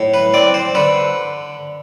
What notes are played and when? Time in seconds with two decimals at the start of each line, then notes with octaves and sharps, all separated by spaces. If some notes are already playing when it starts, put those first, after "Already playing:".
Already playing: A2
0.14 B4
0.34 C4 D5
0.54 C5
0.75 D3 B4